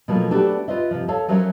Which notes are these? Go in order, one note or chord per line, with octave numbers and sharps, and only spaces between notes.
B2 F3 F#3 A3 A#3
A3 D4 F#4 G4 A4 B4
F4 B4 C5 D#5 E5
C3 F3
A4 C#5 E5 F5 A5
F3 F#3 C#4 A#4 C5 E5